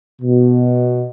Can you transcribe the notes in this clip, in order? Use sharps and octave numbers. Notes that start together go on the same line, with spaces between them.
B2